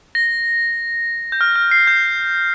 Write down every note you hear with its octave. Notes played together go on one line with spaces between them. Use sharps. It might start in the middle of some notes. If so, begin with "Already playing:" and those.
A#6
G6
F6
F6
C7
G6